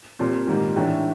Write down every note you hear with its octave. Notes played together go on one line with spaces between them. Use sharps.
A#2 G3 C4 F4
G#2 D#3 G3 A#3 D#4
A2 E3 A3 D4